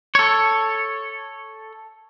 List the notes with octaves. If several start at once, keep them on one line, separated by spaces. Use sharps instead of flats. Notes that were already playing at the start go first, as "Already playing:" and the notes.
A4 C#5